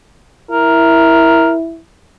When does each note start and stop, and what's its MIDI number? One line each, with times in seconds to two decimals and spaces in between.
0.51 1.79 64
0.51 1.53 70